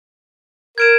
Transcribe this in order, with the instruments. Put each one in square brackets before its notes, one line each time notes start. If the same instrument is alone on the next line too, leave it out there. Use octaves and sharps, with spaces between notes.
[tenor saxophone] A#4 [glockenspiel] G#6 D7 E7